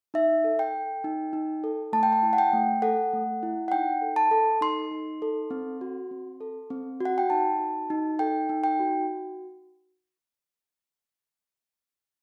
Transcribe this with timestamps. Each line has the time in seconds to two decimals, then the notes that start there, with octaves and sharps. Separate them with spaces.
0.14 D#4 E5
0.44 A4
0.59 G5
0.74 A4
1.04 D#4
1.33 D#4
1.64 A4
1.93 A3 A5
2.03 G5
2.12 A5
2.23 E4
2.33 F#5
2.38 G5
2.53 A3
2.82 A4 F#5
3.13 A3
3.43 E4
3.68 F#5
3.72 D#4 G5
4.02 A4
4.16 A5
4.31 A4
4.61 D#4 C6
4.91 D#4
5.22 A4
5.51 C4
5.81 F#4
6.11 C4
6.41 A4
6.70 C4
7.00 F#4
7.05 F#5
7.18 G5
7.30 D#4 A5
7.60 F#4
7.90 D#4
8.19 A4 G5
8.49 D#4
8.64 G5
8.80 F#4